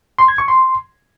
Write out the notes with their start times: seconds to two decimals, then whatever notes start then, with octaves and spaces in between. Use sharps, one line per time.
0.19 C6
0.28 G#6
0.38 C#6
0.48 C6